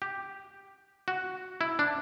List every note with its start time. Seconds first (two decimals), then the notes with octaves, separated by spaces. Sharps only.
0.02 G4
1.08 F#4
1.61 E4
1.79 D4